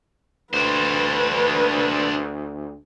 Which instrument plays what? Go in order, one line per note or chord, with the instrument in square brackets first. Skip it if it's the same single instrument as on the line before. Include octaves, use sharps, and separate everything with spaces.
[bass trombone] D2 [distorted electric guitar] D4 C5 [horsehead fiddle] B4